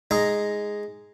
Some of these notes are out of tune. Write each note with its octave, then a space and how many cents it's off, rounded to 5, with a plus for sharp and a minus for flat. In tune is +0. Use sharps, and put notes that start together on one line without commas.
G#3 +0 D#4 +0 A#5 +0